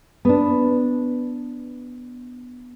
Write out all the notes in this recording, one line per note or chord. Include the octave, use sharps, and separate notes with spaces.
B3 D4